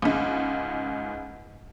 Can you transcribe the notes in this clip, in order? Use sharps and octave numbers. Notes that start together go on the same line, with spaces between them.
C#2 G#2